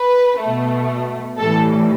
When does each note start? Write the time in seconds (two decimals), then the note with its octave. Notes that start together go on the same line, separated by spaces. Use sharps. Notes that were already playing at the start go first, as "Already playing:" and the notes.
Already playing: B4
0.41 B2 A3
1.39 A2 E3 G3 A4